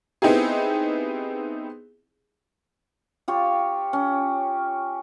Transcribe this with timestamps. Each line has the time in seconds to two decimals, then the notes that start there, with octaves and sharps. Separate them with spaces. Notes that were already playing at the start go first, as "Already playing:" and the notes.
0.22 B3 C4 D#4 E4 G4 G#4
3.28 F4 G4 C#5
3.93 C#4